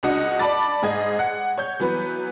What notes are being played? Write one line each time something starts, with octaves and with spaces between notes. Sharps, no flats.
C#2 D4 F#4 D#5 F#5 C#7
D5 A5 B5 D6 A6
G#2 G#4 D#5 G#6
F#5
C#5 G6
E3 F#3 B3 B4